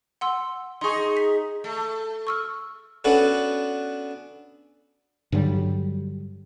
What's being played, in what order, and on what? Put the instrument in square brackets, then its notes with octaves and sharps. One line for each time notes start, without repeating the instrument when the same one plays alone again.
[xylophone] F#5 C6 E6
[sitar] D#4 G#4 [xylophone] C6 C#6
[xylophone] B6
[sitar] A3
[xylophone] C#6 E6 F6
[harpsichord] B3 C#4 D4 F#4 A4 B4
[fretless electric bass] G2 D3 F#3 G3